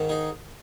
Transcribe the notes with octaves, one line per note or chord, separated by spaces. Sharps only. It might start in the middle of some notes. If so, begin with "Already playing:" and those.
Already playing: G#2 D#3
D#4 G#4